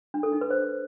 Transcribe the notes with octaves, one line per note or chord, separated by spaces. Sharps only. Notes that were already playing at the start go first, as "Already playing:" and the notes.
D4
A4
D#4
B4
C5